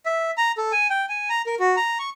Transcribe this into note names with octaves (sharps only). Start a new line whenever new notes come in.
E5
A#5
A4
G#5
G5
G#5
A#5
A#4
F#4
A#5
C#6